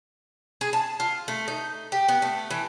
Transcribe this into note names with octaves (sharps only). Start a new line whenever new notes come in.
G#4
A5
F4
A3
D#4
G4
B3
A3
E3